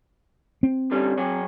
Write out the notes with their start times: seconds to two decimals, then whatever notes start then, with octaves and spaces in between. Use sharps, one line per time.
0.63 C4
0.91 D3 G3 C#4
1.18 F#3 G#4 C#5